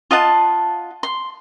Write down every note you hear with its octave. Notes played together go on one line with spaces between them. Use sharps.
F4 D#5 F#5 A5
C6